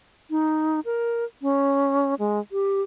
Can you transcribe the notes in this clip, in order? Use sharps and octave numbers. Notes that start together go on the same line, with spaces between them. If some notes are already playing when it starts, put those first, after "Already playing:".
D#4
A#4
C#4
G#3
G4